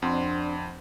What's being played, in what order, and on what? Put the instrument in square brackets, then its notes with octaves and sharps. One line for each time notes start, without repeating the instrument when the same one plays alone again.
[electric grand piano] F2 [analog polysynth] C4 D4 [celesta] F#5 C6